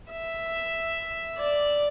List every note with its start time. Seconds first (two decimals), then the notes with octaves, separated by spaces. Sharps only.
0.11 E5
1.38 D5